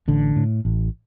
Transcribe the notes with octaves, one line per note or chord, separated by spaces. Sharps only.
A1 D3
A2
A1